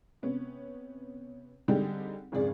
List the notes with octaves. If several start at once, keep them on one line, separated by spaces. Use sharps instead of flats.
C3 B3 C#4
D3 G3 C4 D#4 G4 G#4
G#1 F2 C#3 G#4 D5